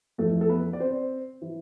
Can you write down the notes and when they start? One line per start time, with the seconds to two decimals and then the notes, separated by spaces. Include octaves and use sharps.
0.18 F2 E3 A3 A4
0.41 A4
0.49 B3 B4
0.73 D5
0.80 C4 C5
1.42 E3